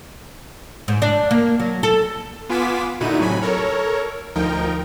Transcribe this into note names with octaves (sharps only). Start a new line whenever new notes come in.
G#2
D4
A#3
F#3
A4
B3 F4 G#5 D6 B6 E7
A#2 D3 D#4 E4 F#4 D#7
A2 C3 F#3 G#5 B5
A4 A#4 C#5
D2 F3 D#4 A#4 G5